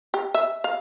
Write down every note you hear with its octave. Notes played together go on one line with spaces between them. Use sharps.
G4
E5
F5